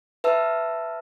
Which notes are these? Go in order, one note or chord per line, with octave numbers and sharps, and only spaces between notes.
B4 E5 A5 E6